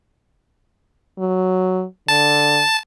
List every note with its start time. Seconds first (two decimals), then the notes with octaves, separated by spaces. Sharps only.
1.19 F#3
2.08 D3 A5